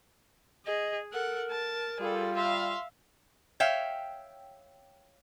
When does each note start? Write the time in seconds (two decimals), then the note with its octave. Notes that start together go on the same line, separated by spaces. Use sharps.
0.66 G#4 D#5
1.13 A4 A#4 F#5
1.51 A5
2.00 G3 F4 G#4 A4
2.36 E5 F5 C6
3.60 C#5 E5 F5 G5